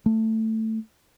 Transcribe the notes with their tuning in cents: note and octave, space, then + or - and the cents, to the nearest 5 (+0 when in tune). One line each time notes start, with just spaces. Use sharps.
A3 +10